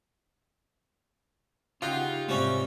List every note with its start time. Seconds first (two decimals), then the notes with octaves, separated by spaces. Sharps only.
1.82 C#3 D#4 F4 G4 F#5
2.29 G#2 C3 G3 C#4